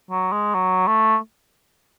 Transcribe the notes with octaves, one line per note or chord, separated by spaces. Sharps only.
F#3
G#3
F#3
A3